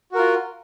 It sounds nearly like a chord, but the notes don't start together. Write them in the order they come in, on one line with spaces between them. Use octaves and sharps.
F#4 A#4 F4